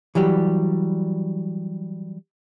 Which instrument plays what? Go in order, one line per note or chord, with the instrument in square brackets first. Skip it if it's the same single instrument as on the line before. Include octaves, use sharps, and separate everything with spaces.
[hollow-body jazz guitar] E3 F#3 G3 G4